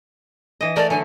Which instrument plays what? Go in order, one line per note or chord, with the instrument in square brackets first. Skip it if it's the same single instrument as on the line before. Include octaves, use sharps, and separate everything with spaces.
[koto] E3 D#5
[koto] A3 A#4 [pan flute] D5
[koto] D3 F#3 [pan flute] G#5